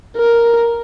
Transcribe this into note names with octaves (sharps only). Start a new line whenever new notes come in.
A#4